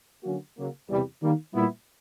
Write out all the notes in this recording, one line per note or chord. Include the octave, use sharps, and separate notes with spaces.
D3 F#3 A#3 C#4 F#4
C#3 F#3 A#3
E2 C3 E3 G3
D#3 G3 A#3
A#2 G3 B3 E4